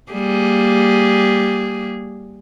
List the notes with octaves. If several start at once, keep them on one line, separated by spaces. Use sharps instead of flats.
G3 A#3 G#4